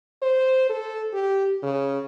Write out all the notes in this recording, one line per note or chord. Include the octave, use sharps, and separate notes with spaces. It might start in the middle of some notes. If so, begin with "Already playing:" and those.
C5
A4
G4
C#3